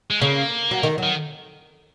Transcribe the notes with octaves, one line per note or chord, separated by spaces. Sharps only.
G#3
C#3 A#3
F#3
D#3
F#3
D#3